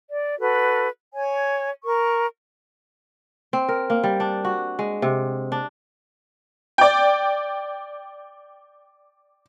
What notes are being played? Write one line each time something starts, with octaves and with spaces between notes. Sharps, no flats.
D5
F#4 A4 B4
C#5 G#5
A#4 C#6
C4
A#4
A#3
G3
D4
F#4
G#3
C3
D4
D5 G5